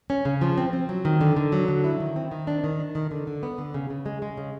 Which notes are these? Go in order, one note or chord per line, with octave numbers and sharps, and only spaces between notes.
C#4
C#3
F3
C4
C4
F#3
D#3
D3
D3
F#3
D3
E4
D#3
C4
D#3
D4
D#3
D4
D#3
D3
D3
B3
D3
C#3
C#3
G#3
G#3
C#3